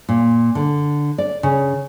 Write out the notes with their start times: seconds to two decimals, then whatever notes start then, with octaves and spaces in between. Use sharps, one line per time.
0.09 A#2
0.55 D3
1.18 D5
1.43 C#3